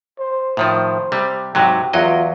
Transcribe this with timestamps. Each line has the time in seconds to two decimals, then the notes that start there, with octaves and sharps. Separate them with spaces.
0.19 C5
0.57 A2 D#3 F3 C5
1.12 C3 G3
1.55 G#2 C3 F#3 G5
1.93 E2 F#3 F4 D#5